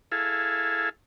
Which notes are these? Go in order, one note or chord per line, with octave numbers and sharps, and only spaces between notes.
E4 G#4 A4 F5